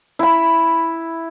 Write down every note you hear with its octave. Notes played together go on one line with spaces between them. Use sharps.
E4 B5